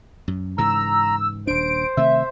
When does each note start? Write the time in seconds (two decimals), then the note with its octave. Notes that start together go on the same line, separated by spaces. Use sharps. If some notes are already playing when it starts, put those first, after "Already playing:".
0.28 F#2
0.58 G#2 C#3 E3 A#5 E6
1.47 D#1 D4 C5 D7
1.97 C3 D#3 A3 E5